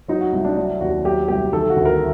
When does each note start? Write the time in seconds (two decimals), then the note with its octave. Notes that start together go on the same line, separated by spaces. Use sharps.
0.08 F#3 D#4
0.21 F#4
0.33 C2
0.44 D4
0.57 F#3 D4
0.80 D#2 F#4
1.04 F#3 G4
1.28 C2 G4
1.53 D#3 A4
1.69 F#4
1.76 D2
1.85 A#4